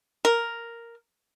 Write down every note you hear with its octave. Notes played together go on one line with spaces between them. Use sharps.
A#4